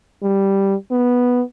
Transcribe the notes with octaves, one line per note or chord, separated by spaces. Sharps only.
G3
B3